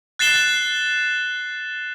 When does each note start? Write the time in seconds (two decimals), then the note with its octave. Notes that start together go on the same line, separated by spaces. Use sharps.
0.19 F#6 A6 C7 E7 G7